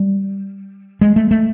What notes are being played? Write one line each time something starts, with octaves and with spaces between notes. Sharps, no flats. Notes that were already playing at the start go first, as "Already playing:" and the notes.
Already playing: G3
G#3
A3
A3